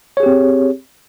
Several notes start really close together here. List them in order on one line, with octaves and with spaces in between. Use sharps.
C#5 G#4 G4 C4